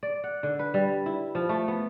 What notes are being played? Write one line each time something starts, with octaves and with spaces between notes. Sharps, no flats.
D5
F#5
D3
B4
G3
E4
F3
A3
B3